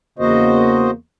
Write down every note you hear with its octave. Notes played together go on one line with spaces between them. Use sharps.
E2 C#3 A#3 F#4 C5 D#5